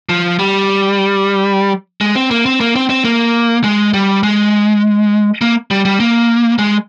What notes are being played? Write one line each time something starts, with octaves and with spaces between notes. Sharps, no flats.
F3
G3
G#3
C4
A#3
C4
A#3
C4
C4
A#3
G#3
G3
G#3
A#3
G3
G3
A#3
G#3